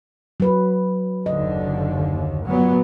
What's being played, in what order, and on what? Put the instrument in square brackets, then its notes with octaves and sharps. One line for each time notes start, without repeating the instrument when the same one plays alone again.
[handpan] F#3 B4
[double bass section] F#1 D#2 D3 [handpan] D#5
[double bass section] A#2 F#3 B3